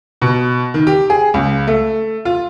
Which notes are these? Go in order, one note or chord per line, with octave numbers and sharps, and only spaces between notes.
B2
D#3
G4
G#4
C#2
A3
F4